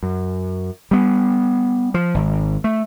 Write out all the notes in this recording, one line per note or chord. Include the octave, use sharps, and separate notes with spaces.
F#2
G3 B3
F3
G#1
A3